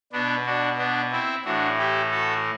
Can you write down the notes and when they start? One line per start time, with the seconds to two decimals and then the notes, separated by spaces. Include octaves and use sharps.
0.12 B2 B3 D4
0.46 D4 F#4
0.78 B3 D4
1.11 C4 E4
1.45 A2 E3 D4 F#4
1.78 E4 G4
2.11 F#4 A4